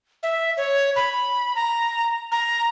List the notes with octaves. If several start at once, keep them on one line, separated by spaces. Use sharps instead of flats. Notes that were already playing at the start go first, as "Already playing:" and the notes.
E5
C#5
B5
A#5
A#5